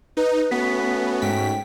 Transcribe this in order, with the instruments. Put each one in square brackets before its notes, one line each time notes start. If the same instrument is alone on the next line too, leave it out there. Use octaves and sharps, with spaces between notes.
[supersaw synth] D#4 [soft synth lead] B4
[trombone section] A3 C#4 F#4 [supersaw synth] B3 [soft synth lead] B6
[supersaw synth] G#2 B6 [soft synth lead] G5